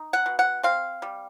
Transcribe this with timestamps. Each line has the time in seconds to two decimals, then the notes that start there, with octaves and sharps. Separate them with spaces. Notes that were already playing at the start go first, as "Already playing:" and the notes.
Already playing: D#4
0.13 F#5
0.26 B2
0.39 F#5
0.63 C4 F5
1.02 G3